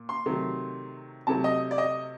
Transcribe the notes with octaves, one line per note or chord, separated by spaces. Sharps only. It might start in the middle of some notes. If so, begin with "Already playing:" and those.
Already playing: A#2
C6
C3 D#3 F#3 A3
C3 F#3 A3 A5
D#5
D5
D#5